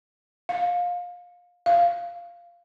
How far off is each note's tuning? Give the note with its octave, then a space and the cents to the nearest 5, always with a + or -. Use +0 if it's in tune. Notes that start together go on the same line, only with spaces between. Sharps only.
F5 +25
F5 -10